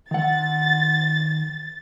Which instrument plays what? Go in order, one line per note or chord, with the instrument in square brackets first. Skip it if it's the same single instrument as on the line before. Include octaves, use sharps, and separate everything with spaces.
[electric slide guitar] D#3 F#5 [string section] A6